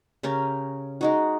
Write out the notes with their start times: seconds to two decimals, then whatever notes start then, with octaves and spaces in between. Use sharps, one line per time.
0.23 C#3 C#4 G4 A#4
1.01 G#3 D#4 F#4